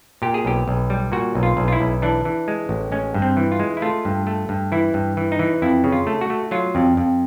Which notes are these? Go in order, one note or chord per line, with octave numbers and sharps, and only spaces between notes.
A#2 G4
G#4
B1 G4
B1
G3
A#2 F#4
B1
F4
B1
F4
E4
B1
E3 D4
E3
G#3
A1
G#3 C#4
G2
C4
E3
F4
G#3
E4
A3 F4
G2
A3
G2
E3 E4
G2
E3
D#4
E3
F2 E4
C#3
F4
A3
F#4
A3
F#3 F4
F2
F2